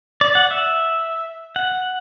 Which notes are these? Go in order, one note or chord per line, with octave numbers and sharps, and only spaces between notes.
D5
F#5
E5
F#5